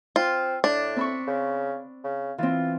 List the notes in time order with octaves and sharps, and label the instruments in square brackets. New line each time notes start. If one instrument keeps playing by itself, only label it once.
[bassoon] C4 [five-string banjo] F4
[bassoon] A2 [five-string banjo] D4
[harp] C4 B5 C#6
[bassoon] C#3
C#3
[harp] E3 C4 [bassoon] F4